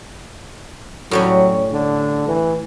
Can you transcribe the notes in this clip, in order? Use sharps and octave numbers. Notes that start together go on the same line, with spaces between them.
A2 F#3 G3 C#4
D3
E3